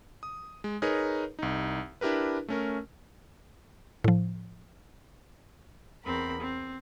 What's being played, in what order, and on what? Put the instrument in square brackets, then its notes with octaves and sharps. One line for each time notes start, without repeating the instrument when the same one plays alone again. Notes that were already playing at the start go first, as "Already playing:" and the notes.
[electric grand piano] D#6
G#3
D#4 G#4 A#4 B4 C#5
C2 D#4
D4 E4 G4 A#4 B4
A3 C#4 A#4
[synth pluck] A2 F3
[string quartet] E2 C4 A#4 B5
C4